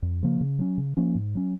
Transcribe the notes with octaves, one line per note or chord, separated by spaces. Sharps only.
F2
C#3 F3 A#3
C#3
F#3 C#4
C#3
F3 A#3 C#4
G#2
F#3 C#4